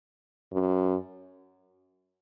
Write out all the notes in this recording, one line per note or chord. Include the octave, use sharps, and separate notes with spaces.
F#2